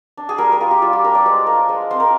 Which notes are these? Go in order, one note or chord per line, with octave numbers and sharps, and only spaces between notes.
D4
G#4
G3 A#4
A#4
F4 G#4
G4
G3 F4
G4
D4 A#4
D5
G#3 C5
F4 A#4
G#3 C5
C4 C5
A#4